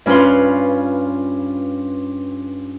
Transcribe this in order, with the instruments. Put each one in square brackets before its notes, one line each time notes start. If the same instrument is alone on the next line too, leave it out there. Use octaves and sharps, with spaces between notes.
[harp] G2 C#4 F4 B4 C6